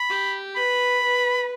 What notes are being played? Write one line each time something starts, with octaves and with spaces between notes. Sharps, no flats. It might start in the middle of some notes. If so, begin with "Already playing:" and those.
Already playing: B5
G4
B4 B5
B4